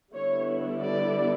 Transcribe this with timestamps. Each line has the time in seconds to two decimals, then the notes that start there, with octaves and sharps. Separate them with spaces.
0.13 D3 G3 B3 E4 C#5
0.81 D5